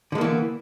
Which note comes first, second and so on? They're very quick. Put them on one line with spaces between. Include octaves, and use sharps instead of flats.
D3 G#3 A#3 E3 B3